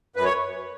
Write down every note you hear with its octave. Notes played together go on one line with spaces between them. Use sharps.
F#2 B4
C#5